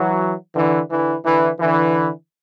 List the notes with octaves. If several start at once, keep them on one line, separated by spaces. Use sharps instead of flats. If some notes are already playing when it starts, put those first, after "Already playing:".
Already playing: E3 F#3
D3 E3
D3 E3
D3 E3
D3 E3